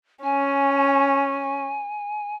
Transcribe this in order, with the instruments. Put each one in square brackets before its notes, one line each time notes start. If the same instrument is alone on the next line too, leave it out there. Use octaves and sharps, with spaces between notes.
[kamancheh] C#4 [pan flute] G#5